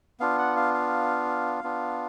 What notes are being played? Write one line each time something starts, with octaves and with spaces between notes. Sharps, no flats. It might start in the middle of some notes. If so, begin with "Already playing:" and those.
B3 D4 F4 F5
F#5
F5
F5
B3 D4 F4